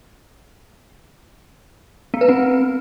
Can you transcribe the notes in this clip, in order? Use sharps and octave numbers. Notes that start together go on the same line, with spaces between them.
B3
B4
C4